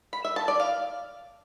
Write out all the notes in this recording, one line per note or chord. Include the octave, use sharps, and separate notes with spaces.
B5
E5
A5
D5
F5